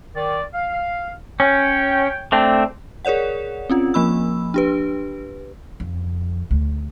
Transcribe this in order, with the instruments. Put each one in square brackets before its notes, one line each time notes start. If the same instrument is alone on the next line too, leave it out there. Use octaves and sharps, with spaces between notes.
[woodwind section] D#3 D5
F5
[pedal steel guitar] C#4 [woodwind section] C#5 G5
[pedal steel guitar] A3 C4 D4
[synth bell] G#4 A#4 C#5 D5 F#5
C4 C#4 F4
F3 A#3 B5 E6
D4 G4 B4
[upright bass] F2
D2